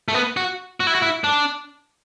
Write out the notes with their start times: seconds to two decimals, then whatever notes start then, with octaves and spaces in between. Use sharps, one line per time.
0.08 A3
0.14 B3
0.37 F#4
0.80 F#4
0.87 E4
0.95 F#4
1.02 E4
1.24 D4